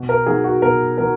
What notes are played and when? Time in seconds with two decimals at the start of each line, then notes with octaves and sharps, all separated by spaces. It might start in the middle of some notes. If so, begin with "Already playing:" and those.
Already playing: B2
0.09 A#4
0.26 F#3 B3 D#4 G#4
0.44 F#4
0.62 B2 A#4
0.98 F#3 B3 D#4 A#4